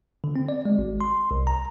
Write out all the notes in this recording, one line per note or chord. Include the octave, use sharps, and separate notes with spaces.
D3
C4
D5
G#3
G#1
C6
C2
A#5